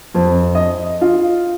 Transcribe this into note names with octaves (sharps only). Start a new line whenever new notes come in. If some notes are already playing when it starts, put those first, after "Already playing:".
F2
D#5
F4